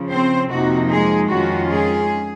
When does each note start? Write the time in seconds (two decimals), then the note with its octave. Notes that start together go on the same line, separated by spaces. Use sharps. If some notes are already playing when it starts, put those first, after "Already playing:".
Already playing: C#3 F3
0.11 C4 C5
0.51 F2 C3 F3 A#3 D#4 F#4
0.91 G#3 G#4
1.31 F2 D#3 G#3 C#4 F4 F#4
1.71 G#3 G#4